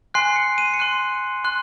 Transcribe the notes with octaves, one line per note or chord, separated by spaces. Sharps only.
G#5 C6 F#6 C7
C#7
D#7
C#7
C6 F#6 D#7
C6 F#6